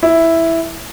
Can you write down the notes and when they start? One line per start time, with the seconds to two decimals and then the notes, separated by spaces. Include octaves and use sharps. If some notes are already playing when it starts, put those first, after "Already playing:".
0.03 E4